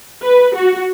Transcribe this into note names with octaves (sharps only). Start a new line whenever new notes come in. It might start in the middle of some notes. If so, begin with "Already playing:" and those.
B4
F#4